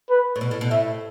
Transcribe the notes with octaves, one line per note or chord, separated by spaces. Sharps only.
B4
A2
B2
A2
B2
A2 E5